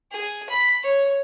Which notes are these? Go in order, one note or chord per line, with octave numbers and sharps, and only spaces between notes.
G#4
B5
C#5